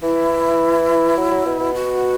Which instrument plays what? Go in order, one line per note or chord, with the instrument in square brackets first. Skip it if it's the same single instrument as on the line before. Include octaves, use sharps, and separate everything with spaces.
[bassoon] E3 [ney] E4
[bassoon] F#3
F#3
B2
B2
[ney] F#4